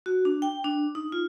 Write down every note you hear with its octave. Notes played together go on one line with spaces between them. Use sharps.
F#4
D4
G5
D4
D#4
F4